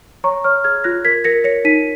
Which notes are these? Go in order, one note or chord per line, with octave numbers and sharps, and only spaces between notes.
C#5 A#5 C#6
C#5 C#6 F6
G#4 F6 G#6
F4 F#6 A#6
A#4 G#6 B6
A#4 A#6 C#7
C#5 A#6 C#7
D#4 B6 D#7